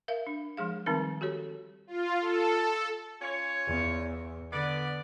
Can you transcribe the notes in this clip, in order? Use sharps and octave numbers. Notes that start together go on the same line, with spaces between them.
A#4 E5 F5
D4
F3 G#3 G#4 F5
D#3 G3 C4 D#4 A#4 A5
F#4 G4 A4 C#5
F4
A4
C#4 F4 C#5
E2
D3 B3 D5